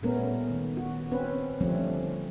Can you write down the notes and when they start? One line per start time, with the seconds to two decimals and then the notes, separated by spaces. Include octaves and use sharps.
0.02 A#2 G3 A3 B3 C#4 A#4
0.50 D#3
0.77 F#4
1.12 C4 C#4 B4
1.61 D3 F3 G3 A3 C4 C#4